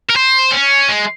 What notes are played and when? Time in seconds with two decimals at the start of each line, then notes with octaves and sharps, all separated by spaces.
0.09 A#4
0.16 C5
0.52 C#4
0.89 G#3